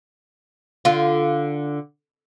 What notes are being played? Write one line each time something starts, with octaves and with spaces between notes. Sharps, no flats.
D3 F4